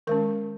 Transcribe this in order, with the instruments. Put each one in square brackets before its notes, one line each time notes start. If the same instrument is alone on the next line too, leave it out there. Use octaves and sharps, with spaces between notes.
[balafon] D#3 G#3 C#4 A#4